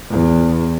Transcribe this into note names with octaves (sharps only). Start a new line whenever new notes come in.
E2